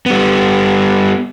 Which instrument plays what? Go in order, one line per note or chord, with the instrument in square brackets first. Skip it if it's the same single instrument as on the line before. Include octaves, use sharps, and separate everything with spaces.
[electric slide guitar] G3 B3